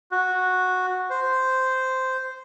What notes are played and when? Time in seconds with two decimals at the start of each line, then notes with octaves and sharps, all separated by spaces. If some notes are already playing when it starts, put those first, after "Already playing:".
0.11 F#4
1.10 C5